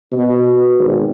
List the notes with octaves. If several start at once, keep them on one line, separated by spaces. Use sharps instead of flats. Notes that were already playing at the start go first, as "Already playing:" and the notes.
B2
G#1